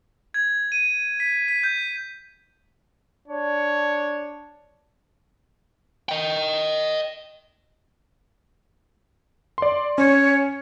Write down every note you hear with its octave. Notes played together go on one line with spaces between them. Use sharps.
G#6
D#7
B6
B6
G6
D4 C#5
D#5 G5
D5 C6
C#4 C#5